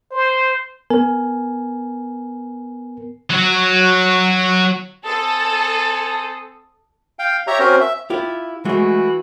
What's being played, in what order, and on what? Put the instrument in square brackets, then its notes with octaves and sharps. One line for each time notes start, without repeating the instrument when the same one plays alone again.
[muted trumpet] C5
[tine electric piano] B3 A#4 G#5
[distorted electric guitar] F#3 F#4
[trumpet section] C4 G#5 D#6 [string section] A4
[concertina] F5 G5
G4 C#5 E5 A#5
C4 C#4 F#4 A#4 C5
E5
[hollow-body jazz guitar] E4 F4 G4
[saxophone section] E3 F#4 [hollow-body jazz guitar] G#3 A3